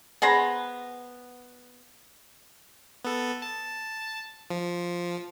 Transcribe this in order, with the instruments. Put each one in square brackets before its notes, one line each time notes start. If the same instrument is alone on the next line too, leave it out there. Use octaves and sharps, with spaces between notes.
[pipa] B3 G#4 C5 A#5
[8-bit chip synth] B3 A4
A5
F3